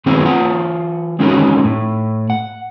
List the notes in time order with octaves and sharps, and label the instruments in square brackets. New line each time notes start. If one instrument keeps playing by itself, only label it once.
[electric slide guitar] D#3 F#3 G#3 B3 C4 E4
E3 F4 F#5
G#3 C4 C#4 D#4 F#4 A#4
A2
F#5